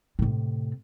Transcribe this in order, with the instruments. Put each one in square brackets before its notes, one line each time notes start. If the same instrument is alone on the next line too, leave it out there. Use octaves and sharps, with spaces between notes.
[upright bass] A2 C3